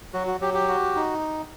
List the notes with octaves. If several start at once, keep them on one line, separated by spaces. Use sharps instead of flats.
F#3 F#4
F#4
F#3 G4
G4
F#4
D#4